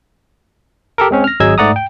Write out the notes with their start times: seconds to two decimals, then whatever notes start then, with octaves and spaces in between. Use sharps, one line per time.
0.98 G4 A4 A#4
1.11 G#3 C4 C#4
1.24 F6 A#6
1.40 G#1 F#3 G#4 D#5 E6 G#6
1.58 G#2 A3 D5 F#5 A#5 D#6
1.76 G5